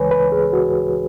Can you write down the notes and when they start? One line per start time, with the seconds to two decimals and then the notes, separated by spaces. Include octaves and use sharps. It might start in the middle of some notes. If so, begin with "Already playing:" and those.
Already playing: C#2 C#3 E3 G#3 B4 C#5 G#5
0.11 B4
0.32 G#4
0.53 F#4